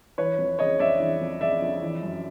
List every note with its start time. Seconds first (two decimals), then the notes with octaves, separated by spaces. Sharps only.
0.18 E3 B4 C#5
0.38 F2
0.59 C#3 C#5 D#5
0.79 F2 D5 E5
1.00 E3
1.21 F2
1.41 C#3 D5 E5
1.62 F2
1.81 E3
2.03 F#2